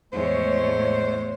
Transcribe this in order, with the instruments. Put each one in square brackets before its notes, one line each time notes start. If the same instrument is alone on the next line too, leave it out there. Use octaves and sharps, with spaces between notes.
[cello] E2 [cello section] A2 A3 C#5 [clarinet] G#3 [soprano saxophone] C5